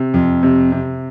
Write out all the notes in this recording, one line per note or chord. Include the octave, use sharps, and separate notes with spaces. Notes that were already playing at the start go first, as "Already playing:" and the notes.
Already playing: C3
F2
C3
C3